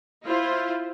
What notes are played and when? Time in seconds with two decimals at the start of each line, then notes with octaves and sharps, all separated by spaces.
0.23 E4 F4 C5